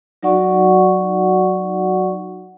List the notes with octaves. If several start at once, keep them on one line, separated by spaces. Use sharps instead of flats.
F#3 D#4 F#4 D5 F#5 C#6